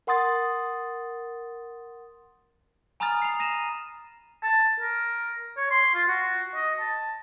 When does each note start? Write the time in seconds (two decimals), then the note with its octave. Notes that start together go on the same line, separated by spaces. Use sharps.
0.07 A#4 F#5 C6 D#6 A6
3.00 G#5 A#5 B5 D#6 F6 A6
3.22 C7 F7
3.40 A#6 D#7 E7
4.43 A5
4.80 A#4
5.57 C#5
5.71 C6
5.94 F4
6.08 F#4
6.55 D#5
6.80 A5